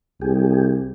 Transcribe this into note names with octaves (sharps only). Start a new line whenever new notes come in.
C2 G4 G#4